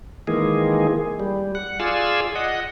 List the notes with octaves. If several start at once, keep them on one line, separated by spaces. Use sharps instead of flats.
D#3 E3 G#3 A#3 G#4
G3
F#5
F4 G#4 D5 F5 G#5 E6
D#5 F#5